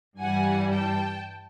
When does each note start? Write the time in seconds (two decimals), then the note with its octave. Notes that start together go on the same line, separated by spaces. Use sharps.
0.19 G2 E3 G3 F#5 G#5
0.71 G5 A5